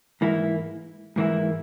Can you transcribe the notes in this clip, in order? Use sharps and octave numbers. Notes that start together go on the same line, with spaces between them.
G#2 E3 A#3 E4
G#2 E3 A#3 E4